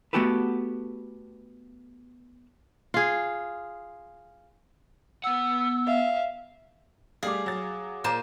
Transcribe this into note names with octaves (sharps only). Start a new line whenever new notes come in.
A3 B3 F#4 G4 A4 B4
F4 G#4
B3 F#5 E6
E5 F5
G3 A3 G#4 F5 D6
F#3 A6
A#2 A#3 C5 A5